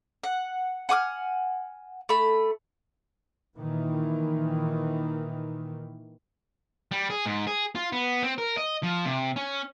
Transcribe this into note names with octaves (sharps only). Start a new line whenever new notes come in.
F#5
F#5 G#5 D6 F6
A3 B5
A#2 D#3 E3
G3
G#4
G#2
G#4
F4
B3
C4
A#4
D#5
F3
C3
C#4